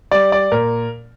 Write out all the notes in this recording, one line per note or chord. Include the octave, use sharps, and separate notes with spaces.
G3 D5
D5
A#2 A#4